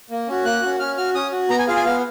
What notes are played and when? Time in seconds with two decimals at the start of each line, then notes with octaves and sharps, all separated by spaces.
0.10 A#3
0.28 C#4 F#4
0.45 A#3 F#6
0.62 C#4 F#4
0.79 C#4 F6
0.97 F#4 F6
1.15 C#4 D#6
1.33 F#4
1.50 B3 A#5
1.59 G#5
1.67 F4 G#4 F5
1.76 G#5
1.84 B3 F5